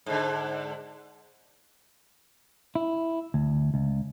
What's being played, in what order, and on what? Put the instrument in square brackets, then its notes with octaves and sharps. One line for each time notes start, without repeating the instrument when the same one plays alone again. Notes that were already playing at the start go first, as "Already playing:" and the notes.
[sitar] G#2 D3
[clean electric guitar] E4
D2
C#2